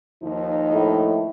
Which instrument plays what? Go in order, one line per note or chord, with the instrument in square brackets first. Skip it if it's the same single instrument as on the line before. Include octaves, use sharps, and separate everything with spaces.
[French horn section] D#2 F3 D#4
[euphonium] A2